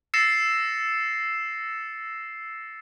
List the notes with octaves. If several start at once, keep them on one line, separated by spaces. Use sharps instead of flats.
E6 A6 A#6 C7 C#7 E7